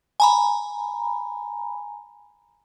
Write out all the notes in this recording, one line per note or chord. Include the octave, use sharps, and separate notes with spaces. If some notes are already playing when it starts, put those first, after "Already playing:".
G#5 A#5 B5